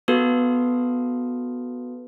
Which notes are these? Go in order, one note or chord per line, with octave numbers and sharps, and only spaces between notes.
B3 F#4 A4 B4